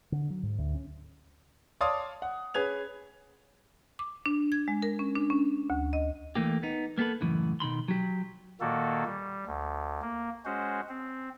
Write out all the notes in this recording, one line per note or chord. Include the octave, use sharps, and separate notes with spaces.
D3
F#3
G#2
D2
C#4
C#5 D5 F5 A5 C6 D#6
F#5
C#4 G#4 B4 G#6 F7
D6
D4
G#6
G#3
A#4
C#4
D4
C#4
D2
D#5
E3 A3 A#3 G4
B3 D#4
A#3 B3 F#4 A4 B4
C#2 F#2 A2 E3
B2 D#3 B5 C6
F#3 G4
A#2 D#3 A#3 F#4 A4
G3
D2
A#3
G#3 C#4 F#4 C5
C4